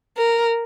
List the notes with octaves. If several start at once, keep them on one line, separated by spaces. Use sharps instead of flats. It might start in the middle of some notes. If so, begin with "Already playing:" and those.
A#4